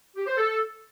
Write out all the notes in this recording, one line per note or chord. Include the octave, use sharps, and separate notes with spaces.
G4
C5
A4